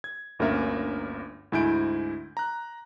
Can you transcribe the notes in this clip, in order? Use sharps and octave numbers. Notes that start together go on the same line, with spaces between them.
G#6
G1 D2 A#3 C#4 A#4 E5
D2 G#2 E4 G#5 G6 D7
A#5 F#6